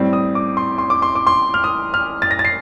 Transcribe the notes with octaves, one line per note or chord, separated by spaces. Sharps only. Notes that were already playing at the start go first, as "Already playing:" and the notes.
Already playing: A2 G3 C4
D#6
D6
C6
C6
D6
C6
D6
C6
F6
D#6
F6
A6
A#6
A6
C7